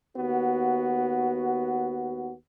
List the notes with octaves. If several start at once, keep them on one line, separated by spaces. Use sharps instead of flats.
D#2 B3 F#4